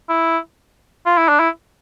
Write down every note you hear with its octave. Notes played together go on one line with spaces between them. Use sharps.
E4
F4
E4
D4
E4